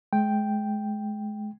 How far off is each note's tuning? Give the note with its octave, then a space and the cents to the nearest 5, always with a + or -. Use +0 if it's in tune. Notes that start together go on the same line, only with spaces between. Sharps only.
G#3 +30 G5 +0